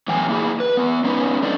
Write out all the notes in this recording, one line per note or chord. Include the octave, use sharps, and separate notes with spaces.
A2 E3 F#3 B3 G5 G#5
A#3 E4 G#4
B4
B3 E4
G#3 B3 C#4 D#4 B4
A3 D4 E4